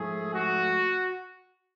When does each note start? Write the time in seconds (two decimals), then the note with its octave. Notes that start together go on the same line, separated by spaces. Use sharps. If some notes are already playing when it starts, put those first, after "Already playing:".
Already playing: G#2 F3 A3 G#4
0.34 F#4